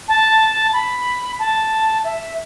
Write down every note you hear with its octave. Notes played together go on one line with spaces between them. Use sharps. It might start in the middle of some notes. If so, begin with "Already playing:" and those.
A5
B5
A5
E5